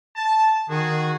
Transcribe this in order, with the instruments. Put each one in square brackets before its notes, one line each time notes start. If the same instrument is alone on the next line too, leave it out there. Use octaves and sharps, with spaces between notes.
[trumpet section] A5
[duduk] D#3 [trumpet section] F#4 G#4